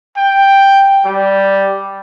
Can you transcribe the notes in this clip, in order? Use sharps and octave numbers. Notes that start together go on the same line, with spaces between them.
G5
G3